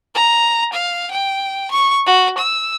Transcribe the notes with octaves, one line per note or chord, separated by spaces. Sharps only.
A#5
F5
G5
C#6
F#4
E6